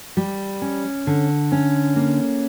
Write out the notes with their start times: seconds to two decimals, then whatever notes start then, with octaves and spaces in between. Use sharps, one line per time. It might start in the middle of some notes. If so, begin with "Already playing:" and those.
0.17 G3
0.62 C#4
1.07 D3
1.52 C#4
1.96 A#3